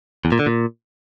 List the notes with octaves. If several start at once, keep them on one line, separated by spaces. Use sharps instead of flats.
E2
A#2
D3
A#2